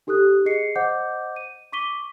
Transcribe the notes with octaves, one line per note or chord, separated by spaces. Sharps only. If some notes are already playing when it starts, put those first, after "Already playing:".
D#4 G4 A4 D#6 F#6
G#4 D#5 C7 C#7
C5 D#5 F#5 D6 G6
D#7
C#6 D6 B6 D#7 G7